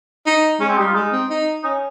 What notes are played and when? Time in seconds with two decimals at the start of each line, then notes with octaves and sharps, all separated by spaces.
0.26 D#4
0.60 G#3 C#4
0.69 C4
0.78 G3 D#4
0.87 F4
0.95 G#3 D#4
1.12 C4
1.30 D#4
1.63 C#4 D#4